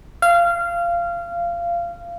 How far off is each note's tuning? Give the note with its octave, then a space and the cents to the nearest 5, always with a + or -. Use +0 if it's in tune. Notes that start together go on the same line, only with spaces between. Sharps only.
F5 -20